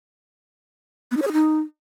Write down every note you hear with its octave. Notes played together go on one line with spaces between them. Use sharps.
B3
D#4
C#5
G#4
D#4